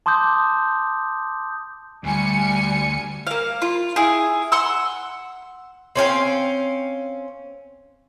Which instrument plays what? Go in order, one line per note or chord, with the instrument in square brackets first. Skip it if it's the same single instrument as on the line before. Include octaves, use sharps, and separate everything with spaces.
[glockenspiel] A5 C6 D6 D#6 G6
[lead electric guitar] D2 [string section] G3 G#5 C#7
[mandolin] A#3 F5
F4
E4 G#4
F#5 C6 E6
[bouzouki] C4 C#4 F5 G5